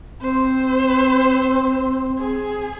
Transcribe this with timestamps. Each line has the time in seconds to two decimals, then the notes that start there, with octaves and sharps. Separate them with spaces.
0.22 C4 C5
2.18 G#4